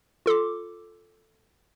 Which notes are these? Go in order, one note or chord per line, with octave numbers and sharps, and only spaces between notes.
F4 A4 C6 D6